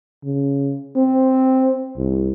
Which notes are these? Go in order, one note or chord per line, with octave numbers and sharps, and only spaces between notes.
C#3
C4
C2